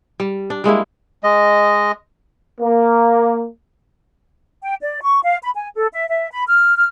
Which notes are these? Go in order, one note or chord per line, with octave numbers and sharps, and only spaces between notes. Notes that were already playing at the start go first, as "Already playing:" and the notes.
G3
D4
G3 G#3 A#3 E4
G#3 D#5
A#3
G5
D5
C#6
F5
B5
G#5
A4
E5
E5
B5
F6
F6